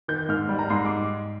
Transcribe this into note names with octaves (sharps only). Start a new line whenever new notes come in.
D#3 G6
G#2 F6
G3
A#5
G#2 C6
D6